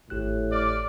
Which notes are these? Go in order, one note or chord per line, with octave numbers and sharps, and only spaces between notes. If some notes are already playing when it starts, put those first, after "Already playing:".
G#1 A2 G4 F#6
D5 D6 F6